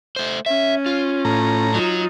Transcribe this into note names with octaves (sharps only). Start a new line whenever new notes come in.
A3 C5
C#4 E5
F4
A2 A#5
F#3 D#4 F4